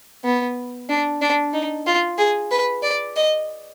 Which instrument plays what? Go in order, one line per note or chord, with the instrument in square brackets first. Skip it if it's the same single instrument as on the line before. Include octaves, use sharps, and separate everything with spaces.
[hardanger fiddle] B3
D4
D4
D#4
F4
G#4
B4
D5
D#5